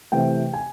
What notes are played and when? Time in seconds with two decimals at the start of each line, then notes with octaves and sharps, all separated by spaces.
0.12 C3 E3 A3 C4 G5
0.54 G#5